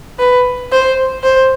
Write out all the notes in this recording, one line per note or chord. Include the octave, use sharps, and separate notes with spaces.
B4
C5
C5